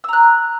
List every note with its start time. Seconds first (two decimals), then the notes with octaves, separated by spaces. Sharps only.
0.04 E6
0.09 A#5
0.13 F#6